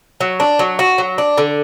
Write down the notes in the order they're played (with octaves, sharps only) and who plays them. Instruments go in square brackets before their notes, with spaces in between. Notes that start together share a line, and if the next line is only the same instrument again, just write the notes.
[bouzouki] F#3
D4
F#3
F#4
F#3
D4
D3